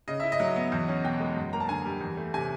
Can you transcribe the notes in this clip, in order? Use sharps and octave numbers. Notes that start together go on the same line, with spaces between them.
C#3 D#5
E4 E5
D#5
F#3
B3
E2
C#4
B2 G5
G#3
F#2
A#3 A#5
A5
D3 G#5
G3
E2
A3
C3 G#5